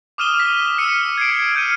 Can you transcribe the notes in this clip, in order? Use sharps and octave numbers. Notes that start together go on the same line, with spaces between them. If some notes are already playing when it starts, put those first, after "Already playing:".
D6 D#6 F6 D#7 E7 G7
B6
E6 F6 C#7 D#7
G#6 C7 D7
F6 G6 C#7 D#7